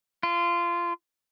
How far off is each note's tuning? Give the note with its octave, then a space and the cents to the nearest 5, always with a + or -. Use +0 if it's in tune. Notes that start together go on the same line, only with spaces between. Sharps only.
F4 -20